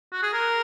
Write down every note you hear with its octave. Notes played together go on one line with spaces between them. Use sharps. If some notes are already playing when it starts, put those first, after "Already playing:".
F#4
G#4
A#4